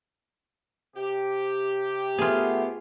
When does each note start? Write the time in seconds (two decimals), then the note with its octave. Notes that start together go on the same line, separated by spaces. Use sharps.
0.95 C3 G4
2.18 A3 B3 F4 G#4